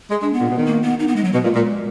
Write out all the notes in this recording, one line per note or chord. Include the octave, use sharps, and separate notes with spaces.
G#3
G#3 D4
B3
A#2
B2
D#3
A#3
B3
D#4
B3
G#3
F#3
B2 G#3
A#2
A#2